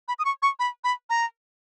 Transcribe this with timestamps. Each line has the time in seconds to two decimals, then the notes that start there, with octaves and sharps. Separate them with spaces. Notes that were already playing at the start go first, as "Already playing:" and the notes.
0.08 B5
0.19 D#6
0.25 C#6
0.42 C#6
0.59 B5
0.84 B5
1.10 A#5